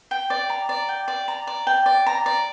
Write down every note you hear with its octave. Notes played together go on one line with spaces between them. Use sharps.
G5
D5
A#5
D5
G5
D5
A#5
D5
G5
D5
A#5
D5